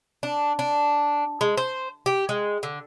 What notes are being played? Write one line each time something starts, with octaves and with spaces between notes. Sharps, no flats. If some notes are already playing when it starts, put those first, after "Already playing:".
D4
D4
G#3
C5
G4
G#3
D3